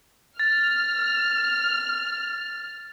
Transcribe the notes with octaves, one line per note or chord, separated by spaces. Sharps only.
F6 A6